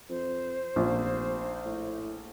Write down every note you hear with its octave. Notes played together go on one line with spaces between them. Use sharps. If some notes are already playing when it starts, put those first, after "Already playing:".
F2 C5
F1 A#1
A2